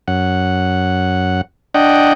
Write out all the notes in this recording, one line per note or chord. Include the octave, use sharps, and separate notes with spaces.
F#2 F#5
D4 D#5 F#5 G5